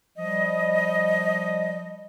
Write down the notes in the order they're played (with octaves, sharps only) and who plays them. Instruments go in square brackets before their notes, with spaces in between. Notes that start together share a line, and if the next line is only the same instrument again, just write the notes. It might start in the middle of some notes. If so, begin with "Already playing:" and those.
[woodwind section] F3 G3 D#5